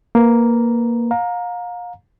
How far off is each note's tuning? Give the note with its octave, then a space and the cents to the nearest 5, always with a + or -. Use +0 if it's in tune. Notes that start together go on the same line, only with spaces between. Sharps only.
A#3 +0 B4 +0 A#5 +0
F5 +30 A#5 +0